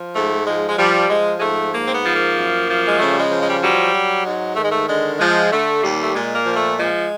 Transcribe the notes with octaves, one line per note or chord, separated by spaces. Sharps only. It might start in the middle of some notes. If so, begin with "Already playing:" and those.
Already playing: F3
G#2 A3
F3 G#3
G#3
F3 G3
F3 G#3
G#3
G#2 A3
G#2 A#3
C4
B3
F3
A#3
F#2
F3
G#3
C#3 A3
G3
G#3
F3
G#3
G3
F#3 G3
F#3
G#2 G#3
D#3 A3
G#3
A3
D3 G#3
F3 G#3
D3 A3
D#2 G3
A3
A#2 G#3
A#3
F3
A3
F3 G#3